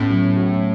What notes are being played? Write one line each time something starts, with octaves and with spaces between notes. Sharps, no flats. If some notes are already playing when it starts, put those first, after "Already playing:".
Already playing: A2 A3 B3 C#4
F#3
F#4